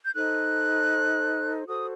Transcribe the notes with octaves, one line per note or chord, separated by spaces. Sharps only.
G6
D#4 A4 C5 F#6
F#4 A4 C5 D#6